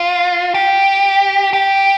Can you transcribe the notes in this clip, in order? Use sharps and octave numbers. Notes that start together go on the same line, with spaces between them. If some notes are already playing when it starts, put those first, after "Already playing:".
Already playing: F4
G4
G4